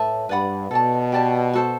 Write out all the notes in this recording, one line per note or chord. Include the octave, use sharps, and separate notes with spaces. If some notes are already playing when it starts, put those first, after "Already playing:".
Already playing: A2 B4 E5 A5
G2 B4 D5 F#5 B5
B2 A4 D5 A5
G4 D5 A5
F#4 A4 C5